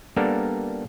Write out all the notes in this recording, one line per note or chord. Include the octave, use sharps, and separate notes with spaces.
G3 A#3 B3 D4 A4 A#4